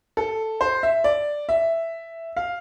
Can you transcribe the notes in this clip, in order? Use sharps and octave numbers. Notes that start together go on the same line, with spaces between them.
A4
C5
E5
D5
E5
F5